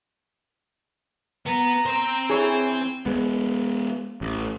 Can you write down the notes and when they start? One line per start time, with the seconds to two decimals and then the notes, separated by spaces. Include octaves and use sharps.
1.46 B3 A#5
1.86 C4 C5
2.30 E3 G#4 C#5
3.06 G#3 B3
4.21 A1